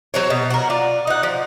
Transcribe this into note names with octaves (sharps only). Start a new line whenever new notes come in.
F#3 C5 C#5
B2
F#4 A#4
F4 D5
D#4 F#5
F3